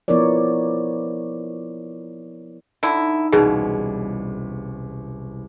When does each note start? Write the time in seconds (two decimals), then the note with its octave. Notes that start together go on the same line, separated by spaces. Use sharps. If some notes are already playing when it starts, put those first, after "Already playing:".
0.08 F3 B3 E4 A#4 C#5 D5
2.83 D3 D#4 E4
3.32 E1 C2 B2 C#4 D#4 E4 G#4